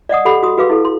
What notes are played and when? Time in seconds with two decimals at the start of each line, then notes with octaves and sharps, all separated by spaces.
0.09 D5 D#5 F#5 D#6
0.25 G4 A4 F#5 B5 C#6
0.43 F#4 D#6
0.58 F#4 G#4 B4 F5 D6
0.70 E4 A4
0.85 C6